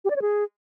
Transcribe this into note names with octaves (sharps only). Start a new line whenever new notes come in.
G4
D5
C#5
G#4